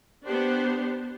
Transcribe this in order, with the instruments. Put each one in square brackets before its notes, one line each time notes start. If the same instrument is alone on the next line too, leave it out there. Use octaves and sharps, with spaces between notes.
[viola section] B3 D4 G4 C5